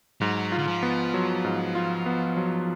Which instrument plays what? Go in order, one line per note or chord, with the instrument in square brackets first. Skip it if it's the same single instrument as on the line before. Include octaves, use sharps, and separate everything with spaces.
[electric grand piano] G#2 [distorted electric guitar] F#3
[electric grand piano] F4
[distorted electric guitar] D3
F3
[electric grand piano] B3
F#3
G#2
F4
B3
F#3